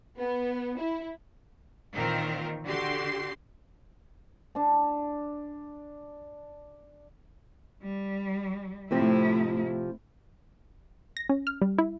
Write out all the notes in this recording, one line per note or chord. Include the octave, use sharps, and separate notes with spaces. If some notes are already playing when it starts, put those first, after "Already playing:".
B3
E4
A#2 D#3 E3 C4 F4 A#4
D3 F#4 G4 C6 C7
D4 A5
G3
A2 C3 F3 C4 E4
A#6
C#4
F6
G3
E4